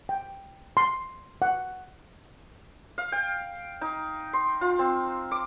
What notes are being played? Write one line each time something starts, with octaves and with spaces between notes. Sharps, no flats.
G5
C6
F#5
F5
G5
D#4
C6
F4
C4
D6